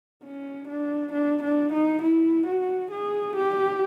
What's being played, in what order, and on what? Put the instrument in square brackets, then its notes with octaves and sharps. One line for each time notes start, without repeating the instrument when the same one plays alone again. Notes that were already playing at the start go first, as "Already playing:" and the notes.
[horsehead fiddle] C#4
D4
D4
D4
D#4
E4
F#4
G#4
G4